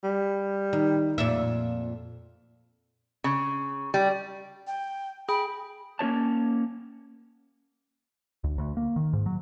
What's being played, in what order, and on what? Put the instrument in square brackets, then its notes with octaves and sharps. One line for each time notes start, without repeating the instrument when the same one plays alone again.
[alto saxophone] G3
[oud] D#3
F2 A#2 E5
[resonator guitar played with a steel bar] C#3
G3
[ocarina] G5
[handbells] G#4 G5 [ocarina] B5
[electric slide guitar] A#3 C#4 F#4 C#5 A5
[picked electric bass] D2
D2
A#3
D#3
G#2
F#3